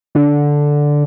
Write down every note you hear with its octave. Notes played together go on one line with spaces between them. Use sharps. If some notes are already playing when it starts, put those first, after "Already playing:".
D3